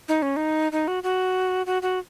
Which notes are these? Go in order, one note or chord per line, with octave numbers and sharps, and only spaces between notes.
D#4
C#4
D#4
D#4
F#4
F#4
F#4
F#4